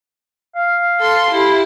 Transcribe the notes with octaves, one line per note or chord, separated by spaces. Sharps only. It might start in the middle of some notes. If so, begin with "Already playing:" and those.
F5
A4 C6
E4 G4